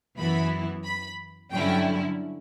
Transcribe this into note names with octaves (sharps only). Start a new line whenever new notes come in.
F#2 E3 B3 E4 B5
B5
G2 D3 F#3 C#4 E4 G5